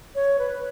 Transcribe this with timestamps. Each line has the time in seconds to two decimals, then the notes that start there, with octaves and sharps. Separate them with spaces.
0.15 C#5
0.39 B4